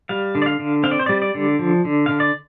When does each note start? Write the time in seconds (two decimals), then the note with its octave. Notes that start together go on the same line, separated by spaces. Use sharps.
0.09 G3 F5
0.35 D3
0.42 D5
0.46 F5
0.60 D3
0.84 C4 F5
0.91 D5
0.99 C5
1.06 G3 D5
1.22 D5
1.35 D3
1.59 F3
1.85 D3
2.06 D3 F5
2.20 D5